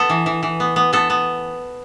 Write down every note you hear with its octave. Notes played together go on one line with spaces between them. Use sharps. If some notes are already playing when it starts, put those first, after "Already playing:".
Already playing: B3 A4
E3
E3
E3
B3
B3
B3 A4
B3